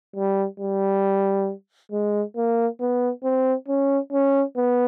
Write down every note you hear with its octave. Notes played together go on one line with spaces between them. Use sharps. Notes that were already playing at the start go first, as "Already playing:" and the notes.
G3
G3
G#3
A#3
B3
C4
C#4
C#4
B3